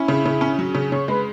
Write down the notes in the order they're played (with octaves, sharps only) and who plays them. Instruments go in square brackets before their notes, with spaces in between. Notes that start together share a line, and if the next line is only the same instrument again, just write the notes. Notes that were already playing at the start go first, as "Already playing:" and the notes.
Already playing: [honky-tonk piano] C#4 [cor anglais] E4
[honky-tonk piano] C#3
C#3
C#4
F#3
C#3
[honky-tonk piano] C#3 [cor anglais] C#5
[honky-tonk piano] G#3 [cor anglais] B4